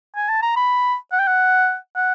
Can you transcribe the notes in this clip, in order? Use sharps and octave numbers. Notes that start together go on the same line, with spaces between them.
G#5
A5
A#5
B5
F#5
G5
F#5
F#5